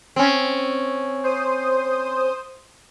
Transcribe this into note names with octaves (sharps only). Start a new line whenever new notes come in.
C4 C#4
C5 D#6